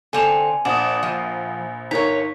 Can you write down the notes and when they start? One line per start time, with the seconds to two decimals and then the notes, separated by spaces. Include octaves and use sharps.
0.13 D3 C4 A4 G#5 A5 F7
0.65 A#1 D4 F#5 D#6
1.03 F3
1.91 G1 D#4 A#4 C#5 A#5 B6